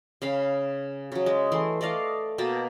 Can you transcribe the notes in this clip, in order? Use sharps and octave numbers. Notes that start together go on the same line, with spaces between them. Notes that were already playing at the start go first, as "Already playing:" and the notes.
C#3 F5 B5
C#3 F#3
G#3
E3 A3 C6
A3 D5 D#5 F5
B2 A#3 A5 B5